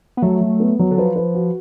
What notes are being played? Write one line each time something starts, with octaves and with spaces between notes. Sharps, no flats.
B3
F#3 A3
F#3
B3
F#3
D3
F3 B4
B4
F#4